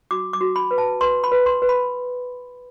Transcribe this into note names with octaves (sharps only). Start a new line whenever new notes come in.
F#4 D6
D6
F#4
B5
B4
A5
B4 C6
B5
B4
C6
B4
B5